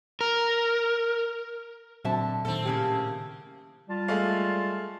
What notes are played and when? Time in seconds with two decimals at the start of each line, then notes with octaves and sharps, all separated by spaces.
0.21 A#4
2.05 A#2 D3 F#3 C4 E5 A5
2.45 A#2 D#3 C4 A4
2.65 A2 C#3 A#3 G4
3.89 G3 F4 A5
4.08 G#3 A3 F5